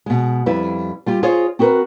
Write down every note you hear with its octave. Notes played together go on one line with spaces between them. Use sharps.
B2 G#3
F2 G3 E4 B4
G3 F4 G4
F4 G#4 C5 C#5 D#5
C4 F#4 G4 A#4 B4